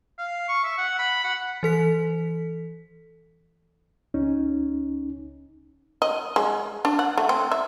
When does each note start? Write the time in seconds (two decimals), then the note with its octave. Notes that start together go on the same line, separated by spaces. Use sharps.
0.18 F5
0.48 C#6
0.64 E5
0.78 F#5
0.99 B5
1.24 F#5
1.63 E3 A4 B6
4.14 C#2 C#4 D#4
6.02 D#5
6.36 G#3
6.85 D4
6.99 F#5
7.18 A3
7.29 C4
7.52 E5